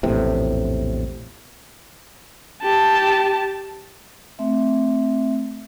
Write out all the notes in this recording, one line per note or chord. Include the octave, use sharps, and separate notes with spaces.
A#1 E2 A2 C3
G4 A5
A3 C4 E5